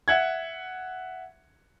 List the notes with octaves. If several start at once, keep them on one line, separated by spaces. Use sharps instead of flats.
E5 F#5 G#6